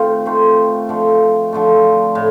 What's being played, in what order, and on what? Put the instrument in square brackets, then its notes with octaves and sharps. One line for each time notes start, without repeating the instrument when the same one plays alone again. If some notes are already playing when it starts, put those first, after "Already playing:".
Already playing: [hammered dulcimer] D#3 A3 C4 F4
D#3 A3 C4 F4
D3 F3 A3
D3 F3 A3
A2